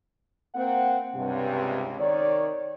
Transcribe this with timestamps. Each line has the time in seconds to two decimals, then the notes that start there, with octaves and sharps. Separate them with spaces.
0.54 A#3 C4 F#5
1.15 C#2 G2 C3
2.00 D#3 C#5 D5